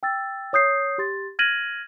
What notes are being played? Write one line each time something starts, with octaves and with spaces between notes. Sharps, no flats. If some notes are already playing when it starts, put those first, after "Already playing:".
G5 E6 A6
C#5 D#6 G6 C7
G4 C6 A6
F6 G#6 A#6 D#7 F#7